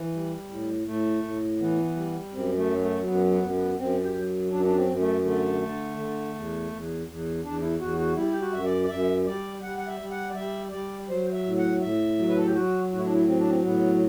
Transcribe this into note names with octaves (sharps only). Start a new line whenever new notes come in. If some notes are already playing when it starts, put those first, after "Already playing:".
Already playing: E3
G3
A2
A2 A3
A2
E3 B3
G3
F#2 C4
A3
F#3
A3
F#2 B3
B3
F#2
B3
F#2 C4
G4
F#3
F#2 D4
D4
C4
F#2
A3
D3 A3
D3
D3
E2
E2
E2
E2 D4
E4
E2 F#4
F#4
G3 E4
G4
F#4
F#2 E5
D5
D5
F#2 E5
G3 D5
G3 F#5
F#5
E5
G3
F#5
D5
G3 E5
G3 D5
F#3 C5
E5
A2
F#5
A2 E5
F#3
B4
A4
G4
F#3 F#4
A2 F#4
E4
D4
E4
F#3 C4
D4
C4
A2 B3